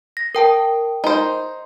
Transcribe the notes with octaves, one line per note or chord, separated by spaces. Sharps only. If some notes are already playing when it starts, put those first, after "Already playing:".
A#6
A#4 G5 A5
D#4 C5